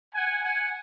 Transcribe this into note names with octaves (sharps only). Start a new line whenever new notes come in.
F#5 G#5
F#5 G#5